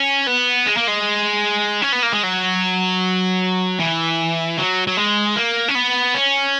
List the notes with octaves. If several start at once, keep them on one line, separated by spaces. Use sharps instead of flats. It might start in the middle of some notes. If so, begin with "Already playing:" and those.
Already playing: C#4
B3
G#3
A#3
G#3
C#4
B3
A#3
G#3
F#3
E3
F#3
F#3
G#3
A#3
C#4
B3
C#4